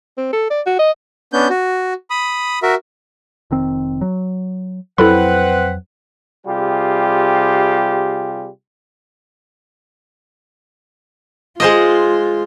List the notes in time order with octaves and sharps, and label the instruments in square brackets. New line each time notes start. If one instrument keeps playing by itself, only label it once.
[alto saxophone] C4
A4
D5
F#4
D#5
[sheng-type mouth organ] B3 C#4 D4 G6
F#4
B5 D#6
F#4 A#4 E5
[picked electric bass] F1 D#3 C4
F#3
[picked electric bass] F2 F#3 [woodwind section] C4 B4 F#5 [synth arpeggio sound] E4 A4 B5
[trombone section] C3 G3 F4 G4 G#4
[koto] G#3 C5 D#5 [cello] F4